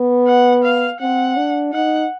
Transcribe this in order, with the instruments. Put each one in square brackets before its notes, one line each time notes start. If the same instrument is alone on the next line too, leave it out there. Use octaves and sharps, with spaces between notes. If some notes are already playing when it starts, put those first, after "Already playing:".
Already playing: [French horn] B3
[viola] F#5
F5
[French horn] C4 [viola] F#5
[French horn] D4
[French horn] D#4 [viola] F#5